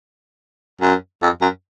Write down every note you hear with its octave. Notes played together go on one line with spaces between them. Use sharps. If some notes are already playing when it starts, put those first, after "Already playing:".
F#2
F2
F#2